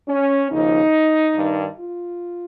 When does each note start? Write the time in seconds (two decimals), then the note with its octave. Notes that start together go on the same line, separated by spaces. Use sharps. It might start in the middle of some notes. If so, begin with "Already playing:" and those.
0.09 C#4
0.51 D#2 C#3 F3 D#4
1.36 G2 D#3
1.80 F4